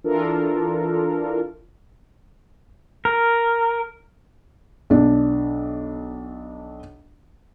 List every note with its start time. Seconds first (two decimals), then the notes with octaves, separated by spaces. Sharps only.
0.04 E3 D4 F4 A4 A#4
3.05 A#4
4.90 B1 D4